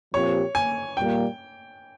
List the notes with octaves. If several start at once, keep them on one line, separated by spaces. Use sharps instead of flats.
A#2 F3 C4 G4 C#5
G#5
A#2 G3 A#3 G5